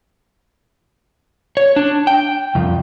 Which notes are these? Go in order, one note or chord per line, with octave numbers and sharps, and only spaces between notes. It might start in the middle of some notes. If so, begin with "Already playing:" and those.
C#5
D4
G5
C2 F2